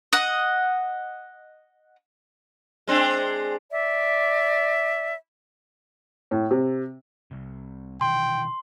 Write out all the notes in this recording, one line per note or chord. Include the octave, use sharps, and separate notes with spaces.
D#5 F#5
G#3 C4 D4
D5 E5
A2
C3
C2 C3
B2 D#3 E3 G5 C6